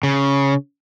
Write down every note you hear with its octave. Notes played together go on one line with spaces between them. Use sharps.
C#3